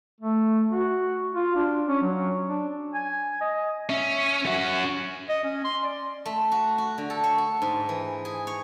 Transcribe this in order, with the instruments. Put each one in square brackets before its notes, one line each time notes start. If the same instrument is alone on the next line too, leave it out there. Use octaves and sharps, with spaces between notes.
[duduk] A3
F#4
F4
D4
C#4
F#3
D4
[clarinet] G#5
D#5
[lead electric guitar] C#4 [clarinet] E5
[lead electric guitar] C#4 F#4
[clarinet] D#5
C#4
C6
D5
[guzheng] A3
F#4
F#4
D3
A4
C#5
A4
G#2
E3
G#4
C#5